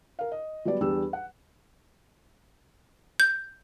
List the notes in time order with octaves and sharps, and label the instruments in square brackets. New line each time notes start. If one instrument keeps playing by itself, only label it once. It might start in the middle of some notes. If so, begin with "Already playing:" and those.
[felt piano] A#4 F5
D#5
F#3 G3 B3 D5
E2 G3 D4 G4 E6
F#5
[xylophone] G6